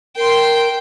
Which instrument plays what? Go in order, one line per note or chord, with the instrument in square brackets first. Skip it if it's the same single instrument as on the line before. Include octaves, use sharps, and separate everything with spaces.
[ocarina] A#4 [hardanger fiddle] G5 C6